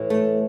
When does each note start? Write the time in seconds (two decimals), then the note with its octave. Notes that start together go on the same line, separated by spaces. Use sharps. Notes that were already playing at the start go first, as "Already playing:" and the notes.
Already playing: A2 E3
0.10 A3